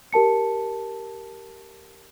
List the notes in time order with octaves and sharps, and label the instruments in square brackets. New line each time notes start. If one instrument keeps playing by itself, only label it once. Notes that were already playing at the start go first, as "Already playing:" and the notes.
[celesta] G4 A#4 A5 C#7